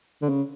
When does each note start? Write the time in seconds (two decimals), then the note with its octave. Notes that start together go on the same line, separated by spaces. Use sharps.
0.22 D3
0.29 C#3